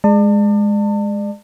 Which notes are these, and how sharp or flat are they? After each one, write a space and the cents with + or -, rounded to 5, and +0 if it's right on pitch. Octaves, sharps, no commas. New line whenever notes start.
G#3 +0 D5 +35 A5 +35